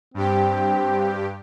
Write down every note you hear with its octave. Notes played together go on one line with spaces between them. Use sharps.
G2 C4 G4